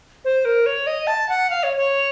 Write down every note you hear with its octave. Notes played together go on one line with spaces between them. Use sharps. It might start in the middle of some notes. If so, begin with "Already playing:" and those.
C5
A#4
C#5
D#5
A5
F#5
F5
C#5
C#5